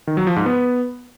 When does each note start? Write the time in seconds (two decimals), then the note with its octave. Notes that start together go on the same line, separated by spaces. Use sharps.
0.07 D#3
0.17 F#3
0.27 F3
0.36 G#2
0.46 B3